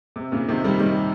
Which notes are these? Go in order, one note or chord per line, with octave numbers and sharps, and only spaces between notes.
C3
A#2 C#3
C3 D#3
D#3 G3
D#3 G3